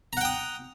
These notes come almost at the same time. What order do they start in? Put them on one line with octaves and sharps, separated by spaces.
A#5 F#5 G5 D#6